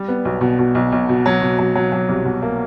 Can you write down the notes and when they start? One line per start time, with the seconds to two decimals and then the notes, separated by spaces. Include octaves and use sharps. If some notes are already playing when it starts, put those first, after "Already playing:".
Already playing: G3
0.08 B3
0.25 B1
0.41 B2
0.59 B2
0.75 B1
0.92 B1
1.09 B2
1.26 F#3
1.42 B2
1.59 F#3
1.75 F#3
1.92 F#3
2.09 C2
2.25 B2
2.42 A#3